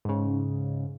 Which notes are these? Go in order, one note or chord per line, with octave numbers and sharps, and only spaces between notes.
G#2 C#3